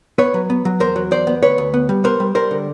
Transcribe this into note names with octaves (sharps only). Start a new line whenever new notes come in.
B3 B4 C#5
F#3
B3
F#3
E2 A#4 C5
F#3
E2 C5 D5
B3
D2 B4 C#5
D2
B3
G3
B3 A#4 C5
G3
G3 A#4 C5
D3